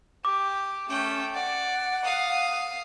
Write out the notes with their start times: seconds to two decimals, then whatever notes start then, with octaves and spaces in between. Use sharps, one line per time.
0.25 G4 D6
0.89 A3 C#4 G5
1.34 D5 F#5
2.04 F5 D#6